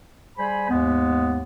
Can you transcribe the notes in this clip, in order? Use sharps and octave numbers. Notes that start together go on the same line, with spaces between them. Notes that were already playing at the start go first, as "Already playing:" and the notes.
G3 G#4 C5 G#5 B5
D#2 G#2 G#3 B3